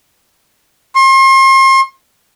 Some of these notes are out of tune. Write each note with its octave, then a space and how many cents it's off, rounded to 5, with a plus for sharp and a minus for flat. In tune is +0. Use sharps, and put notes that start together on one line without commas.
C6 +40